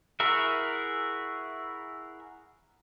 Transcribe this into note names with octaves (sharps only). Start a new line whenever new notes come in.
E4 F#4 G#4 A#4 E5